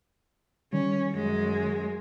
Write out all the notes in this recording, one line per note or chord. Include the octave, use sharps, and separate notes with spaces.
D#3 G3 C#4
F#2 G#3